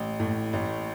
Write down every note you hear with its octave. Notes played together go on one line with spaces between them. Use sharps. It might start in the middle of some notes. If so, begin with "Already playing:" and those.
Already playing: A1
A2
A1